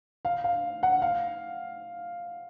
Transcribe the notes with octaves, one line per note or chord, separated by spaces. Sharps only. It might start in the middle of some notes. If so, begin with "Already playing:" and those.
F5
F5
F#5
F5